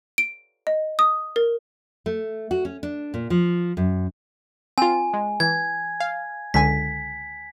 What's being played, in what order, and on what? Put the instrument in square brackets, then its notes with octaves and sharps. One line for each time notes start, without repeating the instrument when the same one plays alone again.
[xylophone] D7
D#5
D#6
A#4
[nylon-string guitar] A3
F#4
C#4
D4
A#2
F3
F#2
[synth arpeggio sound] C4 F4 [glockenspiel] G#5
[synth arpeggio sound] G#3
[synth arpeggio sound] E3 [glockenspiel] G#6
[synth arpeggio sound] F5
[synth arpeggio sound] C#2 D3 G#5 [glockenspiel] B6